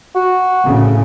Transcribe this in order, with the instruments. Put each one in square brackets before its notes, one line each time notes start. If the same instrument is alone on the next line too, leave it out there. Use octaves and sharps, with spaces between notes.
[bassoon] F#4
[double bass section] A2 C#3